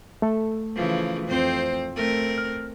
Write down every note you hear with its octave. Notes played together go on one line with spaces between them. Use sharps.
A3 A4
C#3 E3 F3
F2 C4 C5
A3 C4 A#4
F6